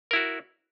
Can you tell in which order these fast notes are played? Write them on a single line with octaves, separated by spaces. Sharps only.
A#4 E4 F#4